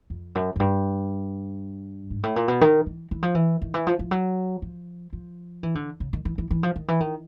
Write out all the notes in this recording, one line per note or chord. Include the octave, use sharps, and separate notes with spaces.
F2
F#2
F#2
G2
G#2
A2
A#2
B2
D#3
E3
E3
F3
E3
D#3
E3
F3
F3
F#3
F3
F3
E3
D3
C#3
D#3
E3
E3
E3
F3
D#3
E3
D#3